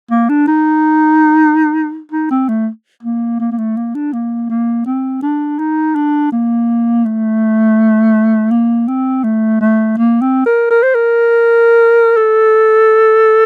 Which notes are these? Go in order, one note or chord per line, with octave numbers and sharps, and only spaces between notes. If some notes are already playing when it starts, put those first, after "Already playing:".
A#3
D4
D#4
D#4
C4
A3
A#3
A#3
A#3
A3
A#3
D4
A#3
A#3
C4
D4
D#4
D4
A#3
A3
A#3
C4
A3
A3
A#3
C4
A#4
A#4
C5
A#4
A4